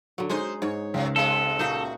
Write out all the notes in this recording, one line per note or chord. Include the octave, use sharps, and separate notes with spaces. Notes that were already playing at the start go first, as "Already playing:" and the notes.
D3 F#3
G#3 C#4 D#4 C5
G#2 C#5
C#2 A2 F#3
C3 G#3 B3 A4
A#2 A3 D#4 F#4